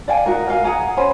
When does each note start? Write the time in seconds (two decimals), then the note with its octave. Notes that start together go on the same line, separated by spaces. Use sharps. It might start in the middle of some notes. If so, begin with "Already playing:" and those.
0.08 D5 F5 G5 G#5
0.26 D#4 F#4 A#4
0.47 A#4 D#5 F5 G#5
0.64 G#4 F#5 G#5 A#5
0.97 C#4 C5 G#5 B5